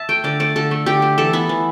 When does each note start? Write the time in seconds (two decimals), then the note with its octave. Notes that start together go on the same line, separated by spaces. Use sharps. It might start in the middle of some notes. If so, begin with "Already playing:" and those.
Already playing: E5 A5
0.09 A3 G5
0.24 D3 D5
0.40 A3 D5
0.56 D3 A4
0.71 A3
0.86 D3 G4
1.02 A3
1.18 E3 A4
1.33 B3 E4
1.49 E3